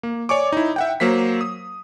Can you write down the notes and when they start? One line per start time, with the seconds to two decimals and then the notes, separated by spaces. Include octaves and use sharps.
0.03 A#3
0.29 C#5 D5 G#5 C#6 D6
0.52 D#4 E4
0.76 E5 F#5 G5
1.00 F#3 A#3 C5 B6
1.41 D#6